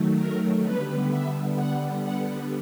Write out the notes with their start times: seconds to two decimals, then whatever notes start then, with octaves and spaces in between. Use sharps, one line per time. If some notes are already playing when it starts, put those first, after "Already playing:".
Already playing: D#3 F#3 A3
0.18 A#4
0.64 D3 G3 B3 B4
1.10 E5
1.56 F#5
2.03 F#5